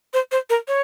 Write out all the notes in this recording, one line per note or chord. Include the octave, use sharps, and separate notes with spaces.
C5
C5
A#4
C#5